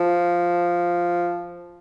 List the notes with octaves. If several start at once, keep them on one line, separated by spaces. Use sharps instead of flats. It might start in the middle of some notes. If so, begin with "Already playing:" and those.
Already playing: F3